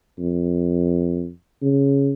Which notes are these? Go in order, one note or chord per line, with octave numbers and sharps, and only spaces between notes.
F2
C#3